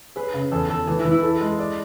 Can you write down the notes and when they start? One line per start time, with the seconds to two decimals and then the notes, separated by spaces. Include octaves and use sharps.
0.16 G#4 B4
0.34 C#3
0.51 E2 A4
0.69 E2 A4
0.87 E3 G#4
0.99 E4
1.05 E3
1.11 E4
1.22 A4
1.41 G#3
1.59 D5